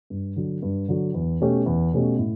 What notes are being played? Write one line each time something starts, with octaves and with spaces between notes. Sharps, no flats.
G2
D3 F#3
G2
D3 F#3
E2
B2 A3 C#4 G4
E2
B2 A3 C#4 G4
A2